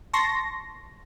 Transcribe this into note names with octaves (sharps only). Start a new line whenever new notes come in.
A5 C6 C#6 A#6